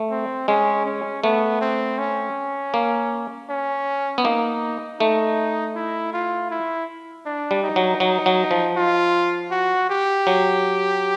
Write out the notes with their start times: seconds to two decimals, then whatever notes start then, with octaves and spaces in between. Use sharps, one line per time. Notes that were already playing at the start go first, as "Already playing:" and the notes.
Already playing: A3
0.10 C4
0.48 G#3 C#4
0.86 C#4
1.23 A3 B3
1.61 C4
1.98 C#4
2.74 A#3
3.49 C#4
4.18 B3
4.24 A#3 D#4
5.00 A3 D#4
5.75 E4
6.13 F4
6.51 E4
7.26 D4
7.51 G3
7.63 D#4
7.76 F#3
8.00 F#3 D#4
8.26 F#3
8.51 F3
8.76 F4
9.51 F#4
9.89 G4
10.27 F#3